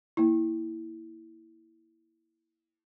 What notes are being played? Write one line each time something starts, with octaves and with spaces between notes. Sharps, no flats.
A#3 E4